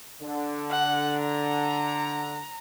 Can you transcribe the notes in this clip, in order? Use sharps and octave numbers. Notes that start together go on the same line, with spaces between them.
D3
F#5
A#5